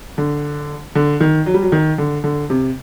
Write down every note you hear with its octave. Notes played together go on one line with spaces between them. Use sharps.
D3
D3
D#3
F#3
G3
F#3
D#3
D3
D3
C3